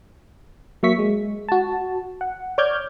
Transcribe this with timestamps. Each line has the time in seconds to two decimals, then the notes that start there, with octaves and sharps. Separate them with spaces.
0.83 F#3 A#3 E5 C#6 B6
0.99 G#3
1.49 F#4 A5
2.21 F#5
2.58 C#5 D5 D6 F6 G6 G#6